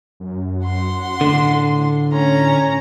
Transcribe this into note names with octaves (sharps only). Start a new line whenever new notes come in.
F#2
F#5 C6
A2 D3
C#4 A#5